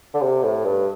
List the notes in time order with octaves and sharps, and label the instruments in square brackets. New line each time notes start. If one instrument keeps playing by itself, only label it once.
[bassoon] D3
C3
A2
G2